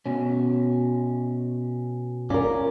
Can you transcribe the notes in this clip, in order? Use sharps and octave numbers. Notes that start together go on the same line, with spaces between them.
B2 C#4
C#4 F4 A#4 D5